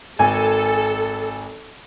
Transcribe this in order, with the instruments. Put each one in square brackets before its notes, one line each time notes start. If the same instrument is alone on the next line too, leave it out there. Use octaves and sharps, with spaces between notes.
[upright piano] G#1 G#5 [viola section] A4